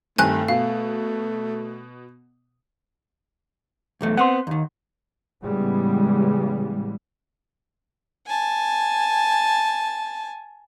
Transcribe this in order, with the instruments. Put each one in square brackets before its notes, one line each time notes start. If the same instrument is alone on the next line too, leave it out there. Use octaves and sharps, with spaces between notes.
[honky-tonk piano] G2 D#3 C4 [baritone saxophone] A3 [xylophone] G#5 F#6
[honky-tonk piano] B2 [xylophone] F5
[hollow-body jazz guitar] B1 E2 A3
[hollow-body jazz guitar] B3 C4 [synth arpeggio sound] F#5 C6
[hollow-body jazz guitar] D#2 D#3
[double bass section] A2 C#3 E3 G3 G#3 B3
[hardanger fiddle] G#5 A5